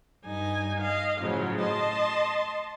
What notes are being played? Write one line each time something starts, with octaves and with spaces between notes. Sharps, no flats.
G2 D#4 G#5
D#5 F5
A2 C#3 F3 F#3
D#5 A5 C6